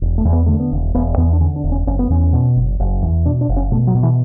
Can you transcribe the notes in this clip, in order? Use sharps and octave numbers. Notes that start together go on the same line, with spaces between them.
E1
A3
E2
B3
D3 A3
B3
E1
E1 B3
E2 B3
D4
D3 C#4
D4
E1
C#4
F#1 C#4
B3
E2 C#4
B2
F#1
F#1
E2
B2 D4
D4
F#1
C#4
B2 A3
F#3
B2
E3